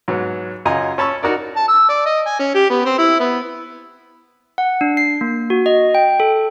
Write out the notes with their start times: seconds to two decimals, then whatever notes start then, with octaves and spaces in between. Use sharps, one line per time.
0.08 G#2 F#3 B3
0.65 F#2 C#3 F4 D#5 G#5 A#5
0.98 C#4 A5 B5 C#6 E6
1.23 D#4 F#4 A#4 D5
1.56 A5
1.68 E6
1.89 D5
2.06 D#5
2.26 G#5
2.39 C#4
2.55 G4
2.70 B3
2.85 C4
2.98 E4
3.19 B3
4.58 F#5
4.81 D4
4.97 C7
5.21 A#3
5.50 F#4
5.66 D#5
5.95 G5
6.20 A4